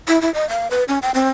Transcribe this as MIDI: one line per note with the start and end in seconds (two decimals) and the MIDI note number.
0.08 0.21 64
0.22 0.33 64
0.34 0.48 75
0.49 0.68 77
0.71 0.84 71
0.88 0.99 61
1.02 1.11 79
1.14 1.30 60